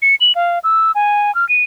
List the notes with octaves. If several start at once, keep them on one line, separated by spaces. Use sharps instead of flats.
C#7
F#7
F5
E6
G#5
F6
D#7